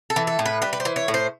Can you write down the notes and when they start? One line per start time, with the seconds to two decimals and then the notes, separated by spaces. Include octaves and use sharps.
0.10 A4
0.16 E3
0.27 A4
0.39 A2
0.46 B4
0.62 G3 B4
0.73 B4
0.80 C5
0.85 E3
0.96 C#5
1.08 A2
1.14 C5